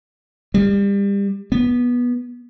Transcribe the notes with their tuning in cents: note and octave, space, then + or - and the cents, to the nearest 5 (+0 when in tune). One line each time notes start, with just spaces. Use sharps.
G3 +30
B3 -15